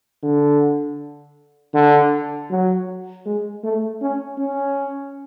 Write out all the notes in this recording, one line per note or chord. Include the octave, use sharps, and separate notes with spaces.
D3
D3
F#3
G#3
A3
C#4
C#4